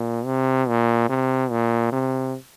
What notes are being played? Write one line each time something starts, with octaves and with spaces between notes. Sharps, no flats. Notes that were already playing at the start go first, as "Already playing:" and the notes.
Already playing: A#2
C3
A#2
C3
A#2
C3